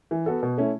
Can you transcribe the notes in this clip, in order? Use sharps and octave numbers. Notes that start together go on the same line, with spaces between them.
E3
B3 F#4 A4
B2
A3 C#4 E4